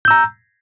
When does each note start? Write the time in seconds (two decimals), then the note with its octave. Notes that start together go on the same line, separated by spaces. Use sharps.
0.05 G6
0.08 E6
0.11 A#5